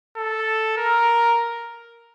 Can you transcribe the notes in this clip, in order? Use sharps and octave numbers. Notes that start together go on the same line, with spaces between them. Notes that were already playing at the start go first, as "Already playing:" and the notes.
A4
A#4